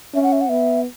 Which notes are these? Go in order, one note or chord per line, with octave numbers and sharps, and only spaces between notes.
C#4 E5
F#5
E5
F#5
B3 E5